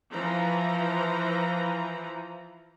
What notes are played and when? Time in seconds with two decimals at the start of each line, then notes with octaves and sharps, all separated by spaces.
0.11 E3 F3 A#5